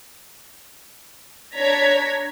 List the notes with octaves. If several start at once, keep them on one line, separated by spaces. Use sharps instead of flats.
D4 C#5 A#5 G#6 B6